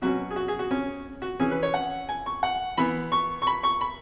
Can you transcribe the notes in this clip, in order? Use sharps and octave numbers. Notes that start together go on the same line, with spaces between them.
B2 F#3 C#4 F#4
G#4
F#4
G#4
F#4
C#4
F#4
E3 C#4 G#4
B4
C#5
F#5
G#5
C#6
F#5
E3 B3 B5
C#6
C#6
B5
C#6
B5